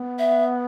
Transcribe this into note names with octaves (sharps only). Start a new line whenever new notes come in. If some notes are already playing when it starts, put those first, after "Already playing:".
Already playing: B3
E5